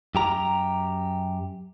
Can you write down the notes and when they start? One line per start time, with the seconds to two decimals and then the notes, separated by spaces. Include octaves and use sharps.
0.15 F#2 G4 A#5